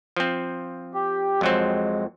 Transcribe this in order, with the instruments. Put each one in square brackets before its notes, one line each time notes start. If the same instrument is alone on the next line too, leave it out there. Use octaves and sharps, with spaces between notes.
[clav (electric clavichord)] F3 C4
[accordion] G4
[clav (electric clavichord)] F2 F#3 C4 [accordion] G#3